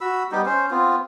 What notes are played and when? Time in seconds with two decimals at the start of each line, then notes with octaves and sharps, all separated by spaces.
0.01 F#4 B5 E6
0.32 G3 B3 D#4 G4
0.46 C#4 C5
0.71 B3 C4 F4